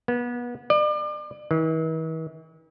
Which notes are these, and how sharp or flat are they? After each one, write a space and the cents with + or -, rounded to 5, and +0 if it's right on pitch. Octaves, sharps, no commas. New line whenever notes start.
B3 -30
D5 +35
E3 -45